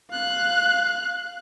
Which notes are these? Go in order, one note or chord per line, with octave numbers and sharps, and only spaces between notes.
F5 F#6